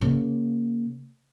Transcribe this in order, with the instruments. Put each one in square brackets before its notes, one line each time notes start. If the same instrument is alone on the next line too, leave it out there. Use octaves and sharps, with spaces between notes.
[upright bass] C#3 A#3